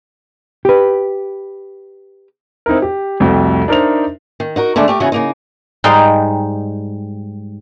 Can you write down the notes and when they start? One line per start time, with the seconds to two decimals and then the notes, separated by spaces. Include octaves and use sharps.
0.65 G4 B4
2.66 C4 D#4 E4 A#4
2.82 G4
3.20 C2 F2 A3 F#4 G5
3.68 D4 D#4 A#4 C5 E5 F7
4.40 D#3
4.56 D#4 F#4 A#4
4.76 D3 G#3 A3 D4
4.88 A3 G4 A#4
5.00 C#3 E3 B3 D#4 F#4 G#4
5.12 C#3 A#3 D#4
5.84 G#2 G3 D#4 D#5 F5 G5